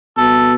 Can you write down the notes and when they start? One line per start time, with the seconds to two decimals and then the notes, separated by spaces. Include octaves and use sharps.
0.17 B2 A4